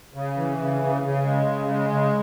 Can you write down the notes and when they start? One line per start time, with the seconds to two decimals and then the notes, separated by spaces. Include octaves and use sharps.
0.14 C#3
0.37 E3
0.58 C#3
0.81 C#3
1.02 C#3
1.24 G#3
1.46 C#3
1.69 G#3
1.90 C#3